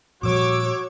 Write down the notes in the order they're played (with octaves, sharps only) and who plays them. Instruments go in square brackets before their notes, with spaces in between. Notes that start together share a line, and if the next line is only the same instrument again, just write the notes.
[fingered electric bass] A#2 F3 G3 [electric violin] F#4 C#5 [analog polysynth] D6 E6 D7